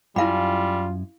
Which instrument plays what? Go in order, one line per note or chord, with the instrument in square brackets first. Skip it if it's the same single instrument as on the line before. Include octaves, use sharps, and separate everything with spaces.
[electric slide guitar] F#2 G#5 [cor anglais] G3 [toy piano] E4 F5 B5 [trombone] F4